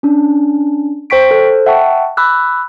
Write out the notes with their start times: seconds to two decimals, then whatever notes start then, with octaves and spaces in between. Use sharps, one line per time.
0.03 C#4 D4
1.10 C5 G5 C#6 B6 D7
1.31 A4 C5
1.66 E5 F#5 G5 A5 C#6
2.17 B5 D6 E6 F#6